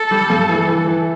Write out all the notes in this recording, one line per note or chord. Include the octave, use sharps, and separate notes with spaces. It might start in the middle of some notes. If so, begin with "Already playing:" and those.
Already playing: A4
G3
G2
E3
E3
E3